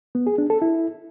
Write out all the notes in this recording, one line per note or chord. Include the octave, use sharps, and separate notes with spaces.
B3
G#4
D4
A4
E4